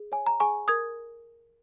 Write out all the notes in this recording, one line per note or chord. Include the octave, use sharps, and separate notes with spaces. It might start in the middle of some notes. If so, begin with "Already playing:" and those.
Already playing: G#4
C#5 G#5
A#5
G#4 G#5 C#6
A#4 D#6 G#6